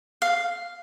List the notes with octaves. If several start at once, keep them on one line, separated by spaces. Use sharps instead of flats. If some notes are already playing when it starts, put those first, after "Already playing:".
F5